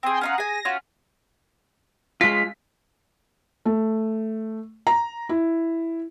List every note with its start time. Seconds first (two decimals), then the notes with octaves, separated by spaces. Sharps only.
0.03 C4 G#4 G5 G#5 C6
0.21 C#4 D#4 F4 F#5 A#5 D#6
0.38 G#4 G#5 A#6
0.65 C#4 F4 F#4
2.21 G#3 F4 B6
3.65 A3
4.87 A#5
5.29 E4